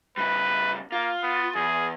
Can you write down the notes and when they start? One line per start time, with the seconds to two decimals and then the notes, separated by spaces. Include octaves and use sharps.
0.18 C#3 G3 B4
0.92 A#3 F4
1.23 B3
1.55 E2 G#4